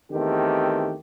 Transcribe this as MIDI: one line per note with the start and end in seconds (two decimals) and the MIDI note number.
0.12 0.95 40
0.12 0.95 51
0.12 0.95 57
0.12 0.95 60
0.12 0.95 67